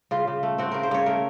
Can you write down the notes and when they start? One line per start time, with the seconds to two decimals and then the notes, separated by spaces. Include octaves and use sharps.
0.11 C#3 F4
0.27 C#3
0.43 A3
0.58 C4 F#4
0.71 C#3 A#4
0.83 C5
0.91 C#3 C#5
1.06 A3 A#4